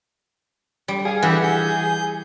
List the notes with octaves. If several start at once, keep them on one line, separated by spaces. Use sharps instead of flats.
G3
G#4 F5
E3 G4 E5 F#5
G6